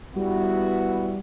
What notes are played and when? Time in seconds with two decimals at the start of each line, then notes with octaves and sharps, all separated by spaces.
0.16 G3 B3 E4 F#4